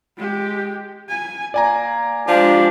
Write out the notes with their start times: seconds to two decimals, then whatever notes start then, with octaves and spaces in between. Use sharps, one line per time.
0.17 G#3 G4
1.08 G#5
1.54 A#3 D5 G#5 A#5
2.28 F3 G#3 D4 G4